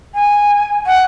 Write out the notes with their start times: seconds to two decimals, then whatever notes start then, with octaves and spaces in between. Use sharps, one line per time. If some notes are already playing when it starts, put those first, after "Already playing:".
0.14 G#5
0.86 F#5